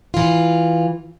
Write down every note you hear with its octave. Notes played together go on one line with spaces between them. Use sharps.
E3 F4